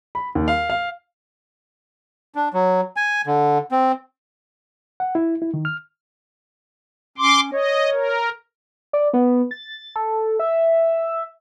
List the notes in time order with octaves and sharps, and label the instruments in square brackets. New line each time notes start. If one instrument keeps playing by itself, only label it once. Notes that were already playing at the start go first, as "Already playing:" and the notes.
[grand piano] B5
D#2
F5
F5
[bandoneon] D4
F#3
G#5
D3
C4
[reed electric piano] F#5
E4
E4
D#3
F6
[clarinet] C#4 [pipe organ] C6 D6
[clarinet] C#5 [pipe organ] D#5
[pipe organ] A#4
[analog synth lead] D5
B3
A6
A4
E5